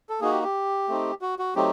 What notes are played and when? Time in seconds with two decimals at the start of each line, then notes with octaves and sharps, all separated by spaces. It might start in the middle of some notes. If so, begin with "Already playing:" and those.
0.09 A4
0.21 A#3 D#4 F#4 G#4
0.31 G4
0.43 G4
0.88 A3 C4 D#4
1.21 F#4
1.39 F#4
1.56 F#3 A3 C4 D#4 G4